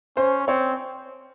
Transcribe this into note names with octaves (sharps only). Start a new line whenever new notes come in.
C#4 C5
C4 C#5